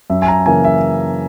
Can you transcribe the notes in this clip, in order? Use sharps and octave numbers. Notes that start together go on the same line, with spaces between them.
F#2 E5
G#5
A#5
C#3 E3 A#3 G#5
E5